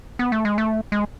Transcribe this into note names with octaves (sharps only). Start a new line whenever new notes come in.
B3
A3
G#3
A3
G#3